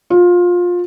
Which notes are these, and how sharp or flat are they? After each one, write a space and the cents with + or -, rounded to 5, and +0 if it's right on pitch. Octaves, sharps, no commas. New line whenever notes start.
F4 +20